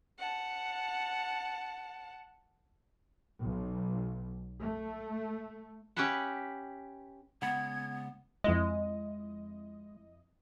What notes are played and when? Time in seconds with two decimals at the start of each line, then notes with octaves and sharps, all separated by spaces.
0.18 F#5 A5
3.41 B1
4.62 A3
5.97 C#4 G4 B4 E5 F#5
7.42 C#3 G#3 B3 F#5 B5 G#6
8.44 F2 G#3 E4 D#5